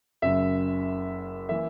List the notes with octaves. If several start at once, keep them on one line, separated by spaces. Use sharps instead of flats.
F#1 F#2 C#3 E5
E3 A#3 E5